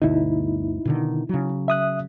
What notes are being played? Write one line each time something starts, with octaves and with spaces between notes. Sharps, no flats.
G1 D2 B2 D#4 E4
B2 D3 D#3
C#3 F#3
E5 D#6 F#6